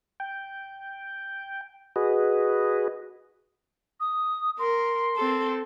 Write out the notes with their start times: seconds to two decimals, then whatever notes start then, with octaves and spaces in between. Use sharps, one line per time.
0.20 G5
1.96 F#4 G#4 B4 D#5
4.00 D#6
4.59 A#4 C6
5.16 C4 A4